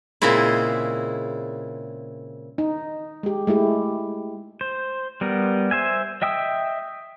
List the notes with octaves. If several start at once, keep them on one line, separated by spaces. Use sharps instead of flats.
A#2 C#3 G#3 C4 E4
D#4
G#3 G4
G#3 A3 E4 G4
C5
G3 B3 A#4
C5 E5 G#5
D#5 E5 G5 D#6 E6